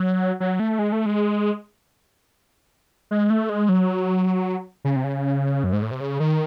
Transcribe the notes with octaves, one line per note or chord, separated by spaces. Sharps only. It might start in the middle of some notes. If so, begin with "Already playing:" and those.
Already playing: F#3
F#3
A3
G#3
A3
G#3
G#3
A3
G#3
F#3
C#3
C3
C#3
F#2
G#2
A2
C3
C#3
D#3